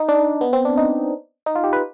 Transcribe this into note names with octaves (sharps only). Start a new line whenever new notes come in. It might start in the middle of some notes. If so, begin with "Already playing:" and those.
Already playing: D#4
D4
B3
C4
D4
D#4
D#4
F4
G4
B4